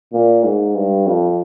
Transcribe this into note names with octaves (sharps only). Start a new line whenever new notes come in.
A#2
G#2
G2
F2